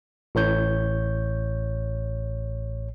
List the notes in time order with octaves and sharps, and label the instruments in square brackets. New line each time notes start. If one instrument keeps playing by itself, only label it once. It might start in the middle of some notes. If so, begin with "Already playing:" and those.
[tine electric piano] A1 A2 C#5 G6